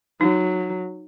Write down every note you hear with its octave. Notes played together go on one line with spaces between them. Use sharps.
F#3 D#4